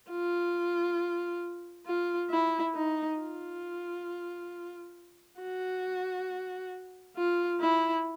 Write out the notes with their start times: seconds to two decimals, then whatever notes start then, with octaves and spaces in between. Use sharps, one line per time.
0.10 F4
1.86 F4
2.30 E4
2.75 D#4
3.19 F4
5.41 F#4
7.17 F4
7.61 E4